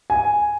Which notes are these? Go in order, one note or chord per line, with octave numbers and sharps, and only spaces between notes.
G#5